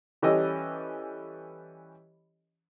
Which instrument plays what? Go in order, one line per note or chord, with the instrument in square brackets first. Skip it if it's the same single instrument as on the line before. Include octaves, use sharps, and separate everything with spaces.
[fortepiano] E3 G3 C#4 G4 A4 D#5